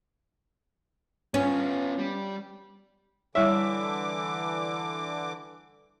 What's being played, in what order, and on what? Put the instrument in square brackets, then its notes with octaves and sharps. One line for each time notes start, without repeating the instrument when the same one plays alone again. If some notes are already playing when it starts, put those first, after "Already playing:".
[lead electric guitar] B3 F4 [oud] C#4
[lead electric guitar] G3
[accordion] D3 E3 D6 [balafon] G3 E4 C#5 [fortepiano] E5